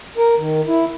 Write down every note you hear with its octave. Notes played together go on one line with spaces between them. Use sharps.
A#4
D#3
E4